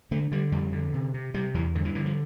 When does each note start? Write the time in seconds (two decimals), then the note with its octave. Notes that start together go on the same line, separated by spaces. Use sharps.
0.11 D3 A3
0.32 D3 G3
0.52 F2 G3
0.73 D3
0.94 C3
1.14 C3
1.34 C3 G3
1.54 E2 E3
1.75 G2 D3
1.85 E3
1.95 D3 E3
2.06 F3